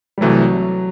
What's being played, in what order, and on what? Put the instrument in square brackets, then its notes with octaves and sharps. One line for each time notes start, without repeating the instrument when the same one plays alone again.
[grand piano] G3
[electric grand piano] C2 C3 E3 A3 [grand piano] F#3